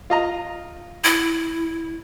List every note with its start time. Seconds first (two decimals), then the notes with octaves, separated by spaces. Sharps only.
0.10 F4 D#5 A#5
1.04 E4